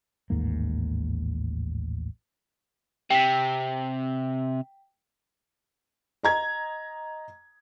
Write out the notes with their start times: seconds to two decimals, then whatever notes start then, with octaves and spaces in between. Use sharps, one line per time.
0.30 A1 D#2 G#2 A#3
3.11 C3 G5 B6
6.23 D#5 A#5 G#6